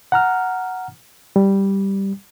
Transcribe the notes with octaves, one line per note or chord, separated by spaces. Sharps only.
F#5 A#5 F6
G3